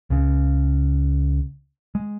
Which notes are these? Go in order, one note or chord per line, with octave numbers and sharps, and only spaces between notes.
C#2 C#3
G#3